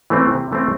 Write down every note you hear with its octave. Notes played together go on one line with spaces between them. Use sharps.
E3 A3 C4
C3
E3 A3 C4